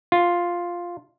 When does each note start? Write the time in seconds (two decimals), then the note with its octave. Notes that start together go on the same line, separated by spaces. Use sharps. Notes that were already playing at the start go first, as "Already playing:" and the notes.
0.12 F4